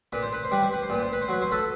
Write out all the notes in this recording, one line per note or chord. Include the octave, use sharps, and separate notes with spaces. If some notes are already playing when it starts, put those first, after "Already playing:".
A#2 B4
C5
B4
C5
G3 B4
C5
B4
C5
A#2 B4
C5
B4
C5
F#3 B4
C5
A4 B4